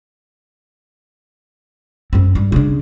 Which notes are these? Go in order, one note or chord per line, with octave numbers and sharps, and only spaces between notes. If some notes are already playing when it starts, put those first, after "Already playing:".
F#2 C4
G2
C#3 D4